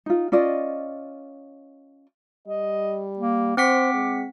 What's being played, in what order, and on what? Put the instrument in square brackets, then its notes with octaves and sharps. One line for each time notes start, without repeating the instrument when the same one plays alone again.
[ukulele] D#4 F4
C#4 F4 D5 D#5
[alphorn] G3 [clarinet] D#5
[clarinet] A#3
[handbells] C4 F#5 B6 [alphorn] C5 [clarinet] D6
[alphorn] G#3